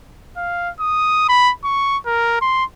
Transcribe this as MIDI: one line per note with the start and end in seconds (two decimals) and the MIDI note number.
0.37 0.70 77
0.80 1.25 87
1.29 1.52 83
1.64 1.98 85
2.06 2.40 70
2.41 2.64 84